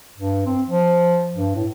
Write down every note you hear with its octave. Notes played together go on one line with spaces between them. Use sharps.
G2
C4
F3
G2
A2